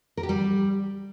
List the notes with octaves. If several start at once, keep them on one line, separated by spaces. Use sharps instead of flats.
A#4
G4
G3